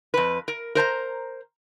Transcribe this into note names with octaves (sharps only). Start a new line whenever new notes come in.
F2 B4
A#4
A#4 C5 A5 A#5